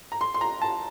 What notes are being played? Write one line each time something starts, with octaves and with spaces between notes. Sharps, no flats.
A#5
C6
C6
A#5
A5